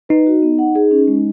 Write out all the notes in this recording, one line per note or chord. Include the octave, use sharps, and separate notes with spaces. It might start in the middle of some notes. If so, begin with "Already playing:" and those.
D#4 B4
F#4
B3
F#5
G#4
C#4
G#3